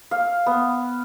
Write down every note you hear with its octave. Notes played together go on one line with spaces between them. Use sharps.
F5
B3